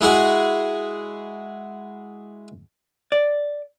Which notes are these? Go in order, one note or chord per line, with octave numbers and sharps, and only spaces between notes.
G#3 E4 F#4 G#4
D5